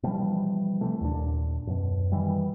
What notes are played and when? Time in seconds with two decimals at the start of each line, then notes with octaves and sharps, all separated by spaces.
0.03 B2 E3 F3 G3
0.81 C3 E3 A3
1.01 D#2 A#2 D4
1.67 F#2 B2
2.12 B2 D#3 E3 G3